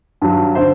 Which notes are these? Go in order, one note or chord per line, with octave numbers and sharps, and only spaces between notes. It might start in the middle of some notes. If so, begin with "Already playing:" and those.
G2 D#3 F#3
D3 C5